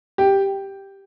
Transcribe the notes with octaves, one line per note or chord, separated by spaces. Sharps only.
G4